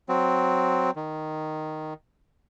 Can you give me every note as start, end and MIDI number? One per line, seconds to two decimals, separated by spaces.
0.09 0.91 54
0.09 0.91 60
0.96 1.94 51